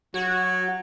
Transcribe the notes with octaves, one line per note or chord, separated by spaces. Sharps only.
F#3 F#4